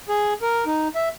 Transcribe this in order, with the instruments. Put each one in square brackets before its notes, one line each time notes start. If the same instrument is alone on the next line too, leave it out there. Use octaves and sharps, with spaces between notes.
[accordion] G#4
A#4
D#4
E5